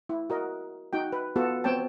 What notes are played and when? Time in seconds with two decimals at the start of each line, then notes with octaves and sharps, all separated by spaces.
0.09 E4
0.30 F#4 A#4 D#5
0.93 D#4 F#4 G5
1.12 B4
1.36 B3 F4 F#4 A4 A5
1.64 B3 C4 C#5 G5 A5